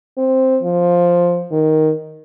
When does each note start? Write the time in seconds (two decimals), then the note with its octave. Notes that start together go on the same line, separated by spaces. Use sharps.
0.18 C4
0.63 F3
1.52 D#3